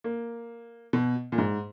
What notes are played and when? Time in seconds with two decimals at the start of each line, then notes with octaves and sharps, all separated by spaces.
0.04 A#3
0.93 B2
1.32 A#2
1.38 G#2